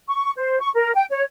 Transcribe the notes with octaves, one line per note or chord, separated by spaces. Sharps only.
C#6
C5
C#6
A#4
G5
C#5